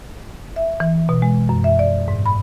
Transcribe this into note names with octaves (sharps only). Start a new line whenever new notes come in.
E5
E3
B2
G#3
F#2
E5
D5
G#2
B5